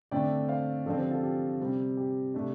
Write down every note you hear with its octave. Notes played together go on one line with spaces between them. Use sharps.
D3 A3 C4 D5 G5
C5 F5
D3 F3 C4 A4 D5
G4 C5
F4 A4
G4
C3 G3 C4
G4
C3 A3 D4